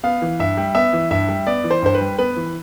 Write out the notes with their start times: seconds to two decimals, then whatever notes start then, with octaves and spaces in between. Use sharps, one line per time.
0.03 B3 F5
0.22 E3
0.39 G2 E5
0.57 G3
0.75 B3 E5
0.93 E3
1.11 G2 E5
1.29 G3
1.47 B3 D5
1.64 E3
1.71 C5
1.82 G2 C5
1.95 B4
2.01 G3
2.18 B3 B4
2.37 E3